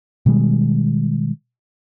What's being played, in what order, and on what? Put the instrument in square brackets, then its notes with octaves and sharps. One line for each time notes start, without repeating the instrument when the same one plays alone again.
[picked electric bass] B2 D#3 G3 G#3